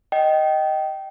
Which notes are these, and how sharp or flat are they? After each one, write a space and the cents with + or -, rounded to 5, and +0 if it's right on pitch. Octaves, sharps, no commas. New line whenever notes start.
D#5 +0 G5 -20